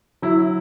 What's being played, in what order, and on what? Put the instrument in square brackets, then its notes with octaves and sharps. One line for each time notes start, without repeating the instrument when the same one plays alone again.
[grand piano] F#3 E4